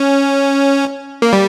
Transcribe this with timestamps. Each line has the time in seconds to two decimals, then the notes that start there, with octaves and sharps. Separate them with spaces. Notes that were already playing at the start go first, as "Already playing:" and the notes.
Already playing: C#4
1.22 A#3
1.33 G3